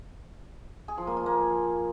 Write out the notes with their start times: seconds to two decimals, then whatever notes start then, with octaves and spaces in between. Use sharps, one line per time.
0.88 G#4
0.98 F3
1.07 A#3
1.17 F4
1.26 A#3